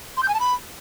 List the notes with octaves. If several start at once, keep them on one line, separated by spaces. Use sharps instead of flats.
C6
G6
G#5
A5
B5